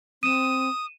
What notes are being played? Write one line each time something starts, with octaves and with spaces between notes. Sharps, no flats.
C4 D#6 D#7 E7